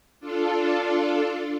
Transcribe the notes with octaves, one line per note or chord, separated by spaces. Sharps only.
D4 F4 A4